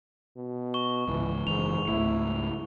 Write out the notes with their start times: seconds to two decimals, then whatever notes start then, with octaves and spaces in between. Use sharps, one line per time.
0.36 B2
0.74 C#6 G7
1.08 C#2 G#2 E3
1.47 F#1 G#2 D3 E3 F7
1.88 C#2 G#2 A3 E4